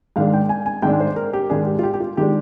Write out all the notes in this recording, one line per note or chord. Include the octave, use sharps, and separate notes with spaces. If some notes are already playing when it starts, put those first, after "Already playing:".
G#2 D#3 G#3 D4 F5
G5
G#5
G#5
G#2 D#3 G#3 D4 G5
C5
A#4
G4
G#2 D#3 G#3 D4 G#4
G4
F4
G4
G4
F4
D#3 G#3 D4 G4